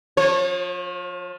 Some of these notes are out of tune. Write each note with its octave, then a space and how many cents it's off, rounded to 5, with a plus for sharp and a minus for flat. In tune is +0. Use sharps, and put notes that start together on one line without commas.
F3 +25 C#5 -35